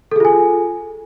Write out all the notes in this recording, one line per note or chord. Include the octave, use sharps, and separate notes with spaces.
F4 G#4 A4 G#5